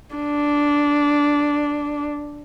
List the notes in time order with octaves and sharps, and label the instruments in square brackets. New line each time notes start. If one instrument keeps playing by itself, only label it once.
[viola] D4